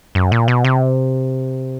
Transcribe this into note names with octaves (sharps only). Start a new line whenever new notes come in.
F#2
A#2
B2
C3